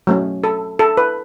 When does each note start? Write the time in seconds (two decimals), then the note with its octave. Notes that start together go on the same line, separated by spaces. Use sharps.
0.07 F#3 A3 C#4
0.44 A4
0.79 A4
0.97 B4